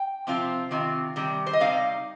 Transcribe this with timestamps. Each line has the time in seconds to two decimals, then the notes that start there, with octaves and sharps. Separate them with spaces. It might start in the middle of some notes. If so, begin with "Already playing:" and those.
Already playing: G5
0.27 C3 F3 C4 F4
0.71 C3 D#3 C4 F4
1.16 C3 D#3 G3
1.46 C5
1.53 D#5
1.60 C3 G3 D#4 F5